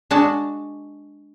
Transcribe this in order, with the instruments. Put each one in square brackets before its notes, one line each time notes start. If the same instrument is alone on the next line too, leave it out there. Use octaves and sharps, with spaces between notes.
[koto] G#3 D4 F#4 A5